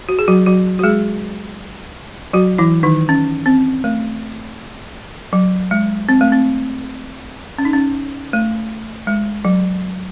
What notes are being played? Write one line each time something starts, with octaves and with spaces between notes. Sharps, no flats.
F#4
G#4
F#3 F#4
F#3 F#4
F#4
G#3 G#4
F#3 F#4
E3 E4
D#3 D#4
C#4
C4
A3
F#3
G#3
C4
A3
C4
C#4
D#4
C#4
A3
G#3
F#3